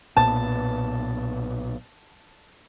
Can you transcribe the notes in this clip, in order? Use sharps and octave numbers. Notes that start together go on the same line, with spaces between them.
B1 A#2 B3 A5